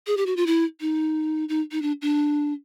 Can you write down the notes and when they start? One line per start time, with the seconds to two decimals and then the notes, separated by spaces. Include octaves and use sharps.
0.07 G#4
0.17 G4
0.26 F#4
0.36 F4
0.47 E4
0.81 D#4
1.49 D#4
1.72 D#4
1.82 D4
2.02 D4